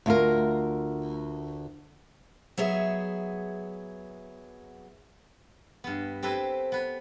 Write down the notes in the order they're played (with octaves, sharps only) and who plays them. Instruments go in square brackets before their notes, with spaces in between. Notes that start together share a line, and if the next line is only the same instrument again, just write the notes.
[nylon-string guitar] D2 F4 A#4
[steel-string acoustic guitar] F#3 B3 G#4 E5
[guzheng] G2 B3
C4 G4 A4 B4 C5 G#5
B3 B4